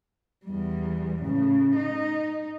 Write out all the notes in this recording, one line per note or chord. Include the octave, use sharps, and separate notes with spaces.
E2 G3
A2 C#3
D#4